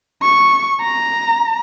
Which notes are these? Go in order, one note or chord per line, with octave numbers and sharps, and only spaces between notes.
C#6
A#5